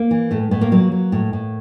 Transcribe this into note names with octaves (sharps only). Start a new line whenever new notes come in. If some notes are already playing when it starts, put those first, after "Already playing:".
Already playing: A#3
E3
A2 A3
A2 B3
A#3
F#3 A#3
F#3
A2
A2